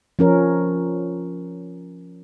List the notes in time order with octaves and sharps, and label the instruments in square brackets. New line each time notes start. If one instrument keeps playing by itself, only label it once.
[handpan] F3 C#4 A#4